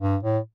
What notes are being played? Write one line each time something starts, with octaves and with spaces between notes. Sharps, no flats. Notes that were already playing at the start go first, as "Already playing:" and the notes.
G2
A2